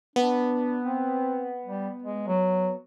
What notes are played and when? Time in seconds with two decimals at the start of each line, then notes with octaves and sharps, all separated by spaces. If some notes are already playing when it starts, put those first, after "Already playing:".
0.16 B3 D4
0.83 C4
1.66 G3
2.03 G#3
2.27 F#3